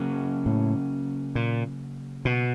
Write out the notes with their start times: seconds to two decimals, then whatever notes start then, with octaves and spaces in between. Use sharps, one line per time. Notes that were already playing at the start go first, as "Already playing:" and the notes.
Already playing: C#3 F#3 A#3 C#4
0.46 A2
1.35 A#2
2.25 B2